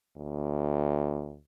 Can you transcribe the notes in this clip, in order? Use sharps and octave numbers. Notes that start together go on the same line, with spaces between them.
D2